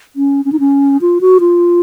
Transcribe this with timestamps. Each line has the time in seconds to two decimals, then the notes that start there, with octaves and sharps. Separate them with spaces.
0.16 C#4
0.45 C#4
0.52 D#4
0.60 C#4
1.01 F4
1.21 F#4
1.40 F4